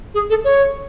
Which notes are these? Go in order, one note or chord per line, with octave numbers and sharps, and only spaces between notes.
G#4
A4
C#5